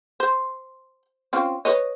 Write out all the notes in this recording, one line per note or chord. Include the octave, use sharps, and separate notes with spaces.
C5
C4 C#4 F4
B4 C#5 D#5